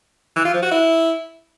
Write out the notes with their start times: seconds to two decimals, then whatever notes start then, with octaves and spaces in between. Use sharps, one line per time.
0.36 E3
0.45 F4
0.54 F3
0.62 F#4
0.71 E4